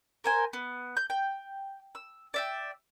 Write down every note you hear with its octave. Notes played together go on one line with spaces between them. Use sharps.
A#4 C5 G#5
B3
G6
G5
E6
D5 E5 G5